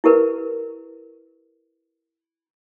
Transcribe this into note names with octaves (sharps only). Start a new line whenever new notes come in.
E4 G4 A#4 B4